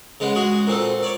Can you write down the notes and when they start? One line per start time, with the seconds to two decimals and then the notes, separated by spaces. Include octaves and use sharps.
0.20 C#3 G#3 B3
0.35 G#3 F#4 G#4
0.67 A#2 C4 A4
1.03 C#5 D5